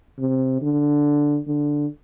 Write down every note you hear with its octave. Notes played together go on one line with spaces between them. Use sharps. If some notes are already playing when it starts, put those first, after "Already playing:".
C3
D3
D3